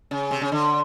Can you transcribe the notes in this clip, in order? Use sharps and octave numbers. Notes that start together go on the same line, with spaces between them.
C#3
C3
C#3
D3